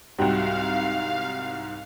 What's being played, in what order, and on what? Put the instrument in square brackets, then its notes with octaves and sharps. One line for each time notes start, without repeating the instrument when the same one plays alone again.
[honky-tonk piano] C2 G#2 [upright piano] G3 F#4 G5 [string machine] F5